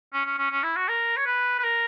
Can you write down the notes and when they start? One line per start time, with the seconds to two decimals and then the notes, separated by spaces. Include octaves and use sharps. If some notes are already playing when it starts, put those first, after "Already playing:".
0.13 C#4
0.26 C#4
0.38 C#4
0.51 C#4
0.63 E4
0.76 F#4
0.88 A#4
1.17 C#5
1.26 B4
1.59 B4
1.64 A#4